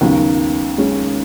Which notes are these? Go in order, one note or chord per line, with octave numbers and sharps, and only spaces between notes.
D#2 C#3 F#3 B3
G#3 C#4